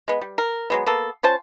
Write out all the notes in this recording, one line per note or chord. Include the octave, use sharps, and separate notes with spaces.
G#3 B3
G3
A#4
F#3 G#3 B3
A#3 B3 A4
C#4 F4 C5 A5